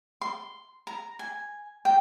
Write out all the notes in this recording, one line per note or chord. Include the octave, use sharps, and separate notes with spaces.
C6
A#5
G#5
G5